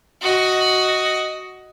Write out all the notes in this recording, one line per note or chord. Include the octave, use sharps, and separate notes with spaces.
F#4 D#5